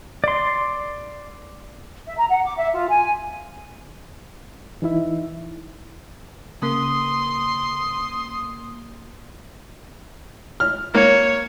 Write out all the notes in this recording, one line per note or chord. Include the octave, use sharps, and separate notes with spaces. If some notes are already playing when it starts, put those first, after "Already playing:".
D5 C6
E5
A#5
F#5
D6
E5
F4
G#5
E3 D#4 E4 E5
C#3 A#3 C6 D#6
F6
A#3 C#5